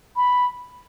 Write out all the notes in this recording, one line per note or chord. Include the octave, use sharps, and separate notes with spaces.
B5